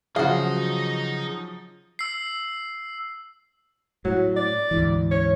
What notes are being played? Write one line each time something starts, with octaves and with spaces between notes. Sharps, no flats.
C#3 F3 F#3 D#4 F#4 G#4 D#5 F5
E6 C7
A2 F#3
D5
D2 G#2 E3
C#5